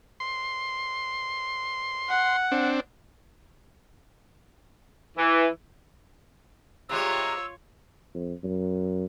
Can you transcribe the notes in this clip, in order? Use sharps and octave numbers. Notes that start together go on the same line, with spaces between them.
C6
F#5
C4 D4
E3
C3 G3 G#3 F4 C#5 E6
F2
F#2